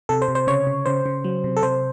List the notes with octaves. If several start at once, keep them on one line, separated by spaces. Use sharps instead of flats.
C3 A4
C5
C3
C5
C#3 C#5
C#3
C#3 C5
C#3
F#3
C3
A4
C3 C5